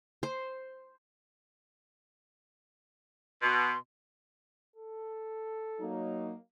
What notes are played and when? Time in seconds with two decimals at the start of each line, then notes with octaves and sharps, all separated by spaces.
0.23 C5
3.42 B2 C6
4.76 A4
5.80 F#3 A#3 D#4